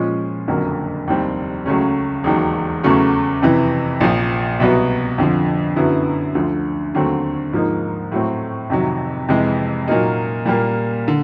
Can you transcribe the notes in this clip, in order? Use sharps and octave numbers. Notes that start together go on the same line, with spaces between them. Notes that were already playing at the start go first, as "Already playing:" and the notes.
Already playing: A#2 F3 G#3 C#4
F#1 F2 D3 F#3 A#3
F1 D#2 D#3 G3 C4
C#2 C#3 F#3 A3 C#4
E1 D#2 D#3 F#3
E2 C#3 F#3 A3 C#4
F2 C3 E3
A#1 A#2 F3
C2 B2 F#3 B3
F2 D3 F3
F#2 D3 F#3 B3 E4
D2 D3 F3
D#2 D3 F#3 A3 C4
G#2 F3 A#3 D#4
A2 F#3 A3 C4
F2 C3 D#3 F#3
F2 C3 E3 G#3
A#2 F#3 A#3 D#4
A#2 G3 A#3
D3